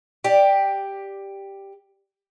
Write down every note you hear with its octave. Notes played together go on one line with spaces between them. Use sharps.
G4 D5